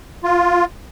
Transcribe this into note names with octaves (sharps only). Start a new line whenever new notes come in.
F4